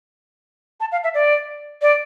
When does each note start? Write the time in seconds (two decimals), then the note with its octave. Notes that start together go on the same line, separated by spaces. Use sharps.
0.80 A5
0.92 F5
1.04 E5
1.14 D5
1.82 D5